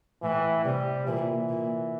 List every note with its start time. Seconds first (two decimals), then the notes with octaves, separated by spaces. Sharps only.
0.23 A2 E3
0.65 C3 G3
1.06 A#2 E3
1.49 A#2